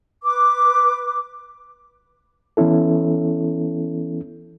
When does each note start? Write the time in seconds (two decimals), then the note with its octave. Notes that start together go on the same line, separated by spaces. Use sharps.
0.23 B4 D6
2.57 E3 B3 C#4 E4 A4